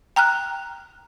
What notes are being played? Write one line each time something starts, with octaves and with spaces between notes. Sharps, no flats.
G5 A#5 F6 F#6